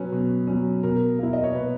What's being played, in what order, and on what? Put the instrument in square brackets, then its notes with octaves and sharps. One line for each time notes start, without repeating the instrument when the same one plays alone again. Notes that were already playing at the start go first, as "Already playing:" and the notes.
Already playing: [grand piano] B2 F#3 C#4 B4
B2
F#3 C#4
B2 A#4
A#3 E4 A#4
D#5
C#5
B2 B4